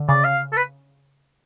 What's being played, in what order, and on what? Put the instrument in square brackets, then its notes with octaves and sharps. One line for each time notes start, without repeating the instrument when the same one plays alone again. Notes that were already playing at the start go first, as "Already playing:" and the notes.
Already playing: [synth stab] D3
[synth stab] C#3 [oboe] D5
[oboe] F5
A4
B4